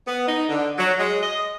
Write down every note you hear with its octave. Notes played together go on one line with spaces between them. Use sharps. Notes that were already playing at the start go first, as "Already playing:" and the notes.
B3
D#4
D3
F#3
G#3
D#5